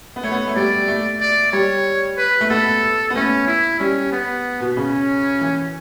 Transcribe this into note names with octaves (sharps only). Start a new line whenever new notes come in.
B3
A3 C#5
B3
A3
G3 D5
A3
D5
G3 C#5
B4
A3
B3 A4
B3
A3 C#4
E4
G3 C#4
B3
B2
C#3 C#4
E3